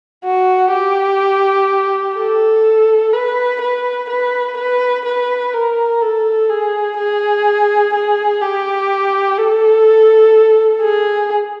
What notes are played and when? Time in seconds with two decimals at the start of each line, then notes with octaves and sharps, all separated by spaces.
0.25 F#4
0.73 G4
2.17 A4
3.13 B4
3.61 B4
4.09 B4
4.57 B4
5.06 B4
5.53 A#4
6.02 A4
6.50 G#4
6.98 G#4
7.94 G#4
8.42 G4
9.38 A4
10.82 G#4